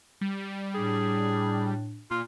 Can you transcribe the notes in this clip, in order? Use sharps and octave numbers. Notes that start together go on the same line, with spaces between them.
G3
A2 D4 G#4
A#2 F4